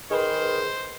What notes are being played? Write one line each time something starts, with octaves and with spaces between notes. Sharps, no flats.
D#3 G#4 B4 C5